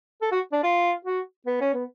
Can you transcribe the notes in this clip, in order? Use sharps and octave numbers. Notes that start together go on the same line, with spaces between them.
A4
F#4
D4
F4
F#4
B3
C#4
B3